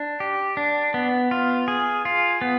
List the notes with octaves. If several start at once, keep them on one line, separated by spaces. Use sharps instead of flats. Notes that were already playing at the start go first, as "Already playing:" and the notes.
Already playing: D4
G4
D4
B3
F4
G#4
F4
B3